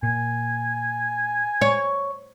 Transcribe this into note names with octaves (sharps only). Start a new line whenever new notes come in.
A#2 G#5
C#5